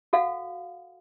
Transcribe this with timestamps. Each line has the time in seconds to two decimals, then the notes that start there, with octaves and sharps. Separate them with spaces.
0.13 F#4 A4 F5 F#5